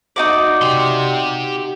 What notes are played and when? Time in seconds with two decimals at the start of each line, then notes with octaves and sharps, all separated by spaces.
0.16 D#4 F#4 D5
0.62 G4 C6